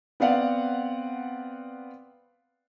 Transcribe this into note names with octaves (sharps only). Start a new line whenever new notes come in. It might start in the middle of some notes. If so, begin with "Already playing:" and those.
B3 C4 D5 F5 F#5